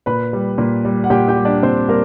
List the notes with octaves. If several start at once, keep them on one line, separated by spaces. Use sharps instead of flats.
A#2 B4 B5
G3
A#2
G3
F#5
A#2 G4 G5
G4 G5
G3
D4 D5
A#2 C4 C5
G3 A#3 A#4